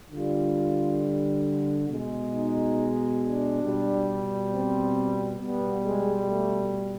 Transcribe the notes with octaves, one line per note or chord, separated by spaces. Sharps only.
D3 G3 F4
B2 G#3
D#4
D4
B2 G3
C4
B2 G3 B3
G#3
A3